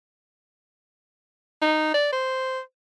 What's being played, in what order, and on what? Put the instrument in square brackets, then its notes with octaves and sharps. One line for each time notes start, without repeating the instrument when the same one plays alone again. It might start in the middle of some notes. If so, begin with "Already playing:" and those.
[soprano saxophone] D#4
D5
C5